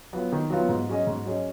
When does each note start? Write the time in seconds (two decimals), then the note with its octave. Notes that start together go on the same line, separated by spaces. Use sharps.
0.13 F#3 B3 F4
0.32 D#3
0.50 F#3 B3 F4
0.69 G#2
0.89 F#3 C#4 G#4 D#5
1.07 G#2
1.26 F#3 C#4 G#4 D#5